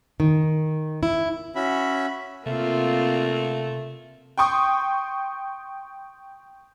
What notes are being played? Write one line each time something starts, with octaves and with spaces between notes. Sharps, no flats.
D#3
E4
C#4 F#4 E5 B5
C3 A3 A#3 C4 F4
G5 C6 C#6 D#6